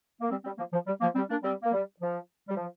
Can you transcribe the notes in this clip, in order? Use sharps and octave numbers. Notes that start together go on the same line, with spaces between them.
A#3
G3 C4
G3 C4
F3 A#3
F3
G3
F3 A#3
G3 C4
A#3 D4
G3 C4
A#3
G3
F3
G3
F3